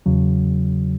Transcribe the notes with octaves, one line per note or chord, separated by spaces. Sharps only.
E2 C#3 F#3